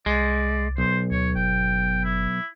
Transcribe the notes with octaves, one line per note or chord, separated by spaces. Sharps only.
C2 G#3 D5
B1 C5
D2 C#5
G1 G5
E4